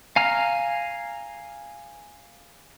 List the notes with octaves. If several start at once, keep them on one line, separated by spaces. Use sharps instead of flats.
F5 G#5 A#5 F6